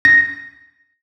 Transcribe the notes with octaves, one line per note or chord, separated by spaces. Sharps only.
A#6